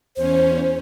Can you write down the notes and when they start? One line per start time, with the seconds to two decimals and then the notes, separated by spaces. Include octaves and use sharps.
0.17 E2 C#4 C5